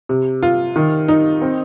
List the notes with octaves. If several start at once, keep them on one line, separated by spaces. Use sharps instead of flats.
C3
F4
D#3
D#4
C4